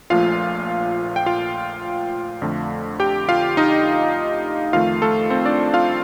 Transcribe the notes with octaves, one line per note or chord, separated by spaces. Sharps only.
A#1 A#2 F3 A3 F4 F5
G5
F4 F5
F2 D3 A3
G4 G5
F4 F5
D#4 D#5
F2 D#3 A3 F4 F5
A3 A4
C4 C5
D4 D5
F4 F5